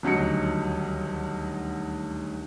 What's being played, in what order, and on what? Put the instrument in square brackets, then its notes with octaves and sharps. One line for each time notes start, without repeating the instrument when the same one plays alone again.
[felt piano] D#1 D2 F#3 D#4 C#7